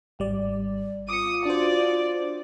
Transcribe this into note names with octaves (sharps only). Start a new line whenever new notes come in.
G#1 G3 D5
F4 D6 D#6 C#7
D4 F#4 C5 D5